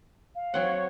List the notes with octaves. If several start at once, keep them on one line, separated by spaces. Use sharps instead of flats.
F5
F#3 C4 C#5 F#5